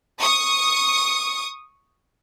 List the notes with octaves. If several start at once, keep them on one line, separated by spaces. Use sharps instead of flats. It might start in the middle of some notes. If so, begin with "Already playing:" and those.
C#6 D#6